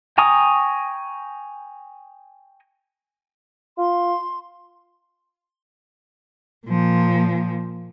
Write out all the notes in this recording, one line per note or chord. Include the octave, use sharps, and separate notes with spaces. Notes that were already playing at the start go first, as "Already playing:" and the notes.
G5 G#5 A#5 C#6 D#6
F4 C6
A#2 F3